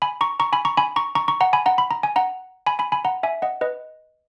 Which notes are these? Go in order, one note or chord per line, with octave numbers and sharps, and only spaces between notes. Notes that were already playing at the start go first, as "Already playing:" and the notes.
G#5 B5
A#5 C#6
A#5 C#6
G#5 B5
A#5 C#6
G#5 B5
A#5 C#6
A#5 C#6
A#5 C#6
F#5 A#5
G#5 B5
F#5 A#5
B5
A#5
G#5
F#5 A#5
G#5 B5
G#5 B5
G#5 B5
F#5 A#5
E5 G#5
D#5 F#5
B4 D#5